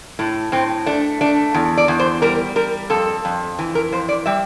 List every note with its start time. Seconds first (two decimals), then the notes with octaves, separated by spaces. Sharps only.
0.19 A2 A3
0.52 A2 C4
0.86 A3 D4
1.21 A3 D4
1.54 E2
1.77 D5
1.88 E2
2.00 C5
2.22 G3 A#4
2.56 G3 A#4
2.90 F2 A4
3.25 F2
3.59 E3
3.75 A#4
3.92 F2 C5
4.09 D5
4.26 G3 E5